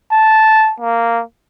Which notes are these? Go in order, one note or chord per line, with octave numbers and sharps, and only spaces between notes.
A5
A#3